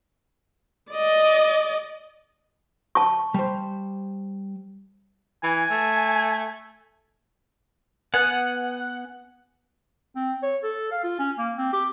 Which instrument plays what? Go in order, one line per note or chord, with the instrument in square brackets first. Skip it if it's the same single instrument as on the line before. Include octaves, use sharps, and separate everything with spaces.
[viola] D5 D#5
[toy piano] A5 C#6
[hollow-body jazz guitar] G3 C5
[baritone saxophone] E3 [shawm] G#5
[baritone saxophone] A3
[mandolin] B3 G#5 [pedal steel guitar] F#5
[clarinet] C4
C#5
A4
F5
F4
C#4
A#3
C4
G4